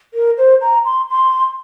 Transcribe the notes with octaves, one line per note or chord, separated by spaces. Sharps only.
A#4
C5
A#5
C6
C6